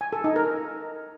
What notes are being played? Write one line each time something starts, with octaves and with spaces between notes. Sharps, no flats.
G#5
A4
D#4
A#4